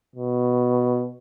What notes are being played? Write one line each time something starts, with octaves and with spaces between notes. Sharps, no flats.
B2